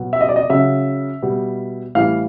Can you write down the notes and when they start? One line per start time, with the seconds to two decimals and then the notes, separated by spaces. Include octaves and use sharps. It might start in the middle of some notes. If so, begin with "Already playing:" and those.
Already playing: B2 F#3
0.13 E5
0.21 D#5
0.29 D5
0.36 D#5
0.49 C#3 F#3 E5
1.22 B2 G3
1.95 A2 E3 G3 F5